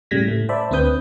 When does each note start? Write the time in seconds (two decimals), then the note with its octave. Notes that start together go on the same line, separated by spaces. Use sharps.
0.11 A2 C#3 G3 G#6 A#6 B6
0.26 A2 A3
0.49 C5 D5 E5 A5 B5
0.71 D2 C4 D4 B4 D#6 G6